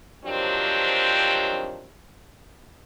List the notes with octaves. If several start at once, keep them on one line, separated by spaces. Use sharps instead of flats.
D#3 F3 F#3 C4 D4 G4